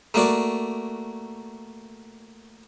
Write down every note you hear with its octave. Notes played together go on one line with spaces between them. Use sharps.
A3 A#3 F#4 D5